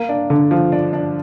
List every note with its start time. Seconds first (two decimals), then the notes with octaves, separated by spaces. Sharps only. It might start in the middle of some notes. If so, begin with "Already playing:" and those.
Already playing: A#3
0.09 D4
0.30 D3
0.51 F3
0.72 D4
0.93 D4